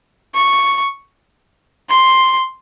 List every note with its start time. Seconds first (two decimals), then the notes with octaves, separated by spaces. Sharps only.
0.35 C#6
1.90 C6